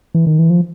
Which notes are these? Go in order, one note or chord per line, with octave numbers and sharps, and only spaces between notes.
E3
D#3
E3
F3